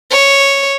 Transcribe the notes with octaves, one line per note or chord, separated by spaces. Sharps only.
C#5